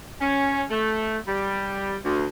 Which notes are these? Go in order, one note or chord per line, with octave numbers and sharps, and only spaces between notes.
C#4
A3
G3
D2